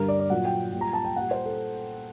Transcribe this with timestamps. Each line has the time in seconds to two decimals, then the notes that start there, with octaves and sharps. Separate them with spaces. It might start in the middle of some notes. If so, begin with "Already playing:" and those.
Already playing: G2 D3 G3 A#4
0.08 D5
0.20 D5
0.30 A#2 F#3 F#5
0.45 G5
0.73 A#2 G3
0.81 A#5
0.93 A5
1.05 G5
1.16 A#2 G3 F#5
1.31 C5
1.46 A4